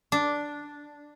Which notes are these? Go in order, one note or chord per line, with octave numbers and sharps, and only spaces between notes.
D4